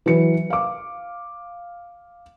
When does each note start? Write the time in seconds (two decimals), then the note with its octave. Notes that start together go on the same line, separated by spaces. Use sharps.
0.06 E3 F#3 B4 C#7
0.50 F5 D6